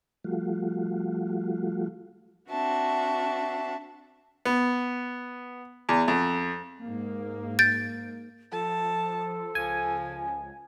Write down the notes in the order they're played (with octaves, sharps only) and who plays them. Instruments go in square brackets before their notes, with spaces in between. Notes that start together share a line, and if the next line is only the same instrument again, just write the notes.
[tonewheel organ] F3 G3 A3 F4 F#4
[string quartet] C4 D4 F#4 E5 A5
[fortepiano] B3
E2
F2
[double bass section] G#2 A#3
[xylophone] G6 A6 D7
[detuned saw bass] F3 [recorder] A4 [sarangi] A5
[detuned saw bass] C#2 [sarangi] F3 [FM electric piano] G#5